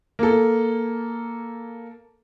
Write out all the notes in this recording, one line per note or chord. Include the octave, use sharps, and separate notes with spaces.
A#3 A4